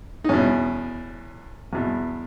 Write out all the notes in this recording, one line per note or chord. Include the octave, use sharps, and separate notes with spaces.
D#4
E2 B2 C#4
E2 B2